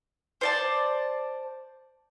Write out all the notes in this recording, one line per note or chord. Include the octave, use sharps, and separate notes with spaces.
C5 D5 A5